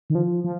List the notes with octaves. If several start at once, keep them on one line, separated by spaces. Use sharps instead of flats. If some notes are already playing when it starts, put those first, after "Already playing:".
D#3
F3
F3